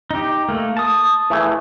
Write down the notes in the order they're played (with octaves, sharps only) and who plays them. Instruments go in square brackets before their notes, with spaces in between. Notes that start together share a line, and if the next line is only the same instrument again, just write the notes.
[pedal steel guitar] D#4 G4
A3 A#3
A5 D#6
[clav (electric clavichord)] E3 A3 G#4